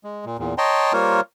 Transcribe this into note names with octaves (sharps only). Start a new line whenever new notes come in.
G#3
A#2
E2 A#2
C#5 D#5 G5 A5 A#5 C6
G3 A#3 F4 A#4 C5 C#5